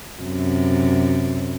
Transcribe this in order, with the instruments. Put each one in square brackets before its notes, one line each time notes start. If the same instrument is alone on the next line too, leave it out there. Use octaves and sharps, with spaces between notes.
[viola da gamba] F#2 C3